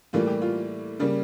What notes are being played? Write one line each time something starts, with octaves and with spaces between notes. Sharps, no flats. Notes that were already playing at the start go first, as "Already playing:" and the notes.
A2 E3 G3 A#3 F4
G4
F4
C#3 G3 A#3